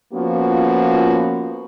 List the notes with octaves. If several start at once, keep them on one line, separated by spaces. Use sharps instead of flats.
F3 A#3 B3 C#4 F4 F#4